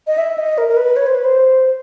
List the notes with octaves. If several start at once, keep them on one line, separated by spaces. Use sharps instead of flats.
D#5
E5
D#5
A#4
A#4
B4
C#5
C5
B4
C5